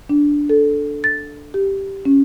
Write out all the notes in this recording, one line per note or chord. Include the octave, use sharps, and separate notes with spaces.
D4
A4
A6
G4
C#4